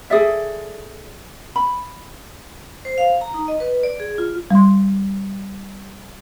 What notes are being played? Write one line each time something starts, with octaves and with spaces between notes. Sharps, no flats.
G#4 A4 D5 E5
B5
C5
F5
A#5
D#4
D#5
B4
D5
G#4
F4
G3 C6